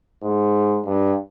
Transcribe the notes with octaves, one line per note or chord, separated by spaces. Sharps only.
G#2
G2